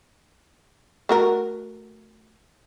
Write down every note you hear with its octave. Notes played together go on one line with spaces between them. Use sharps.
A3 F#4 A#4